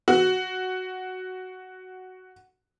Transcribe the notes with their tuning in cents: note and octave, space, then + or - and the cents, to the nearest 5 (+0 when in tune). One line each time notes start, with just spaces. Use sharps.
F#4 +5